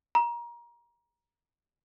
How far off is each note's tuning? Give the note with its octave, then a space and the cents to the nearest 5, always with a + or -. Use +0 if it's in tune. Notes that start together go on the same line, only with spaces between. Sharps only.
A#5 +25